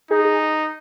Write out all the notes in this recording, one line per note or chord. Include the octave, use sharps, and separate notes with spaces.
D#4 G#4
G#4